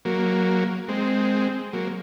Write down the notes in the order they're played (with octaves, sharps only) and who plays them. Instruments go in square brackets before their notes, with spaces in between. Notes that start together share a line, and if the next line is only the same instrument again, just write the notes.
[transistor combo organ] F#3 A#3
G#3 C4
F#3 A#3